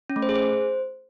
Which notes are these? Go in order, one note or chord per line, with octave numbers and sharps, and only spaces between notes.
C#4
A3
C5
G#4
C5